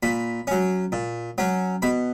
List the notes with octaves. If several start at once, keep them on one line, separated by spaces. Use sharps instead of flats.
A#2 B5
F#3 C#4
A#2
F#3 C#4
B2 B5